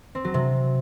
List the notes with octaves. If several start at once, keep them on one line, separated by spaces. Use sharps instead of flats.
C4
F#3
C3